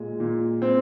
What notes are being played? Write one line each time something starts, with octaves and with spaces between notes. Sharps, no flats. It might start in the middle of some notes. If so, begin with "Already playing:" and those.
Already playing: A#2 G#3
A#2
C4